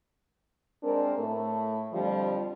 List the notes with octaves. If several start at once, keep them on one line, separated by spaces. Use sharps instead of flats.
G#3 C4 D4 A#4
A2 A3
F2 D3 F3 G3